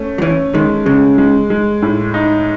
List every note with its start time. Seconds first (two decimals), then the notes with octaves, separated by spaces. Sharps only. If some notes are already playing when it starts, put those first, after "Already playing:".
Already playing: A3 C#4
0.18 F#3
0.22 E3 C#4
0.54 D#3 G#3
0.86 C#3 G#3
1.18 G#3
1.50 G#3
1.82 A2
2.14 D#4